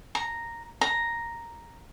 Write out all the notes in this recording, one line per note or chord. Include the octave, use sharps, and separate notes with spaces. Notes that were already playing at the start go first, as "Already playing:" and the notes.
A#5
A#5